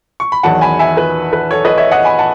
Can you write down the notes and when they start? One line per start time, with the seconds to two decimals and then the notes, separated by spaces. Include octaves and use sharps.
0.20 C#6
0.32 B5
0.43 E2 D#3 F#3 F#5 A5
0.61 G#5 B5
0.79 E5 G#5
0.97 B4
1.33 B4
1.51 A4 C#5
1.65 B4 D#5
1.78 C#5 E5
1.91 D#5 F#5
2.05 G#5 B5
2.19 F#5 A5